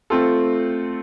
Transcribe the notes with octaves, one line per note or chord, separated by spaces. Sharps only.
A3 C4 F4 A4